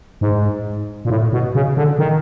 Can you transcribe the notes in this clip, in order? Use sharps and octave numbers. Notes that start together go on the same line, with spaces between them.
G#2
A#2
A2
B2
C#3
D3
D#3